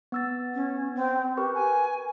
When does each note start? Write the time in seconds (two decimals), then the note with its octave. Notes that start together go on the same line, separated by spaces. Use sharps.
0.12 B3 E6 A6
0.54 C#4
0.95 C4
1.37 G4 A#4 B4 C#6
1.54 G#5